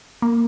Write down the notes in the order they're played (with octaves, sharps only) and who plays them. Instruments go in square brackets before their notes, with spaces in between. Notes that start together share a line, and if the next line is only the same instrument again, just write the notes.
[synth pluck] A#3